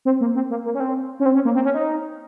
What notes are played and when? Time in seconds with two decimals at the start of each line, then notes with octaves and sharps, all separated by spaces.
0.05 C4
0.21 A#3
0.35 C4
0.50 A#3
0.65 A#3
0.75 C#4
0.80 C4
1.20 C#4
1.26 C4
1.35 C#4
1.45 A#3
1.55 C4
1.65 C#4
1.74 D#4